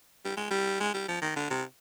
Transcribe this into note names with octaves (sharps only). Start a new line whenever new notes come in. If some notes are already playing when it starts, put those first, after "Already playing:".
G3
G#3
G3
G#3
G3
F3
D#3
D3
C3